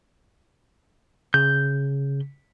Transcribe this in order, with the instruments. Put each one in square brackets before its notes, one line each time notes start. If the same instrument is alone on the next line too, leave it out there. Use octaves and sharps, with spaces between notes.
[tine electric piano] C#3 [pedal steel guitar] G6